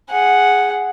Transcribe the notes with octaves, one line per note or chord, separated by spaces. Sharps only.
G#4 F#5